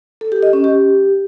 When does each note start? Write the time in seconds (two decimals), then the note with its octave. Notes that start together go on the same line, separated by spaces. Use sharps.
0.21 A4
0.32 G4
0.43 D#5
0.53 C#4
0.64 G4